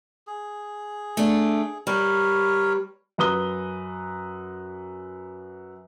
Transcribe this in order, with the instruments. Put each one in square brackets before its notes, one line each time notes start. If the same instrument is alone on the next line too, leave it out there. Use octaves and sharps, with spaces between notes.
[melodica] G#4
[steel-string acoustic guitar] A3 D4
[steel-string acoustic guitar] G3 [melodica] A#4 B4 C#5
[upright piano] F#2 B4 A#5 D#6 G7